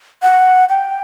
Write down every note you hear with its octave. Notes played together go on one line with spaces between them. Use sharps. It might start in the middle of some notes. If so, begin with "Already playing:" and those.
F#5
G5